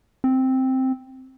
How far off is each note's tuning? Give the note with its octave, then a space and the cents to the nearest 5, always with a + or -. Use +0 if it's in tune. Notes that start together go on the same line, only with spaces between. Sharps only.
C4 +0